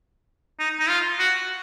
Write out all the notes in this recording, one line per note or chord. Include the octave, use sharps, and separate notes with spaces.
D#4
D#4
F4
F#4